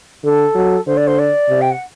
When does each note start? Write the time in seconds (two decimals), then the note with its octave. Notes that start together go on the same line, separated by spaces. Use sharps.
0.24 D3 A4
0.55 F#3
0.86 D3 C5
0.97 D5
1.07 C5
1.19 D5
1.49 C3
1.61 G5
1.71 F#5